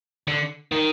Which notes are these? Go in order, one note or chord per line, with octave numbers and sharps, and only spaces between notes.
D3
D#3